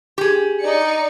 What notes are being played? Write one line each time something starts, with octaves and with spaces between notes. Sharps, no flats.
G4 G#4
D#4 D5 C#7